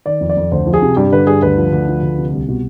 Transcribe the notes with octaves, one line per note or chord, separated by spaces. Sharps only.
D#3 D5
F2
D5
F2
D2 C5
F3
G#4
C3
G2 G4
D3 B4
G2 G#4
D2 B4
F3
D2
F3
D2
C3
C2
B2